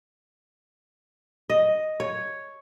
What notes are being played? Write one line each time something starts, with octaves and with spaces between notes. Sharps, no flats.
D#5
C#5